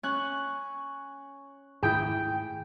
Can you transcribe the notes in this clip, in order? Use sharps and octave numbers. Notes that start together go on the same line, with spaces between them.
C#4 G#5 F#6
G#2 D#3 A3 E4 G#4 G5